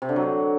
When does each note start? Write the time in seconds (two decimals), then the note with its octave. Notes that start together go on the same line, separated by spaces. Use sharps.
0.02 C3
0.09 D3
0.16 F#3